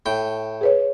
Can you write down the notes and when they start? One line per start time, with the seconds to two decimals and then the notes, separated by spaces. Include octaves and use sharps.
0.06 A2 G5
0.61 G#4 B4 C#5